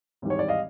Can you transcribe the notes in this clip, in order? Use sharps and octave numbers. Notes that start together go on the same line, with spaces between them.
G#1 G#2 E3 G3
C#5
D5
D#5 F5